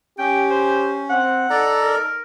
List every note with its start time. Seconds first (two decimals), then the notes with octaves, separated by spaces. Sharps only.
0.18 C#4 G4 G5
0.50 C5
1.10 C4 F#5
1.50 D#4 A4 D5 A#5
1.83 A#4